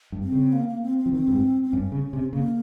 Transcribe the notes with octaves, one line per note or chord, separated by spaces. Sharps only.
G2
C4
C#3
A#3
A#3
C4
C4
F3
D#3 C4
G2
G#2
C4
G2 C#4
C#3
C3
C#3 A#3